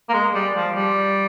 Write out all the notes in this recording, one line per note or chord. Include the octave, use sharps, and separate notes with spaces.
A#3
G#3
G3
F3
G3